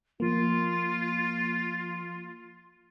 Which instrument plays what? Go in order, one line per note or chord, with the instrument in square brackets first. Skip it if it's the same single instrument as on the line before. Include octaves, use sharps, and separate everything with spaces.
[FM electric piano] F3 A#3 [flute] F4